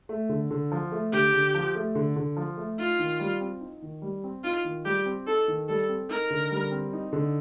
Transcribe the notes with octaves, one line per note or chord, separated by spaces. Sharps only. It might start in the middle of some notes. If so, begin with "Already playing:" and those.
A3
D3
D3
F3
A3
D3 G4
D3
F3
A3
D3
D3
F3
A3
D#4 F4
D#3
G3
C4
D#4
D#3
G3
C4
D#4 F4
D#3
G3 G4
C4
D#4 A4
D#3
G3 A4
C4
D#4 A#4
D3
G3
C4
D#4
D3